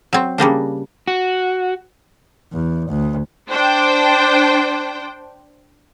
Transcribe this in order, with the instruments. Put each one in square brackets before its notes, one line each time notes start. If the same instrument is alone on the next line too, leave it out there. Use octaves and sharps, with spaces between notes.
[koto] F#3 C4
C#3 G3 A#3 D4
[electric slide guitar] F#4
[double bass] E2
D2
[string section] D4 C5 G5